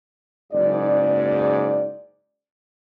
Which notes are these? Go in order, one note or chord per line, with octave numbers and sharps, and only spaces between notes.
F#1 G#2 D5